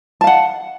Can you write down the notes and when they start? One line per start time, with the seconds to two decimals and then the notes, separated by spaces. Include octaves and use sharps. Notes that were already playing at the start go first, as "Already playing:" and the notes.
0.21 A5
0.24 F5
0.27 F#5